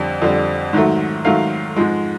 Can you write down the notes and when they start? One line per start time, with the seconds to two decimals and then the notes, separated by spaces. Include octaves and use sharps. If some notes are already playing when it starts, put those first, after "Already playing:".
Already playing: F2 D3 G3
0.22 F2 D3 G3
0.73 G#2 D#3 F#3 A3
1.25 G#2 D#3 F#3 A3 F5
1.76 G#2 F3 G#3